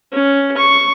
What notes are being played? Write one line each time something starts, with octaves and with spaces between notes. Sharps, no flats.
C#4
C#6